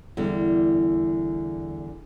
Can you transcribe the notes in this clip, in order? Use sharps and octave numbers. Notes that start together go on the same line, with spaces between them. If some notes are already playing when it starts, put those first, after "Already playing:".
E2 D3 G3